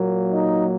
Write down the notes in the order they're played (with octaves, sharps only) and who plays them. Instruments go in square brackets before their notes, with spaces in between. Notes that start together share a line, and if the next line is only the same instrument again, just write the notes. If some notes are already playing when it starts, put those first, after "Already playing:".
Already playing: [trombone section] A#2 F#3 A#3
D#4